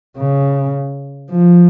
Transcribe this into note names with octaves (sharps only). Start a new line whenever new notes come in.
C#3
F3